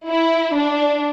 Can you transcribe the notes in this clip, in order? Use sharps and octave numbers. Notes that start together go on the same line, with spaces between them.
E4
D4